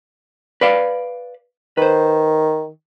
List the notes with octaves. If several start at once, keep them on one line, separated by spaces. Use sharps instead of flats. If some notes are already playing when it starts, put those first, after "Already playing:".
B4 D5 F5
D#3 B4 C5